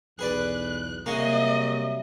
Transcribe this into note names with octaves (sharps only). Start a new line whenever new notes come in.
B1 E2 G#4 B4 D5 F#6
C3 F#3 G3 A#3 F#4 G#4 D#5 E5